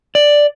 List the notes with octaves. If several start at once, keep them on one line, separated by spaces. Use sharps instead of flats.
D5